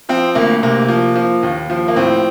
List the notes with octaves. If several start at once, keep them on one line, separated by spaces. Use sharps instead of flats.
F3 C4
D2 A#3
C3 A#3
F3
F3
D#2
F3
A#3
A2 C4